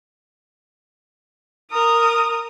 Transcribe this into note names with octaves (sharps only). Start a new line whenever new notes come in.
A#4 D#6